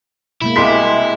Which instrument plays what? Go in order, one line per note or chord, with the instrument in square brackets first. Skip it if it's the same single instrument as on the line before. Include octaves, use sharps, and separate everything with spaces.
[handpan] B2 G#3 A#3 [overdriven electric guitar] E4
[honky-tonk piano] C2 C6 B6 [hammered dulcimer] G#4 D#5 D6